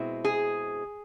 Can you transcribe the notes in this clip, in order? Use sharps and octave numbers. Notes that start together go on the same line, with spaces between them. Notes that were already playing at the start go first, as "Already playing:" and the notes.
Already playing: B2 G#3 C4 E4
G#4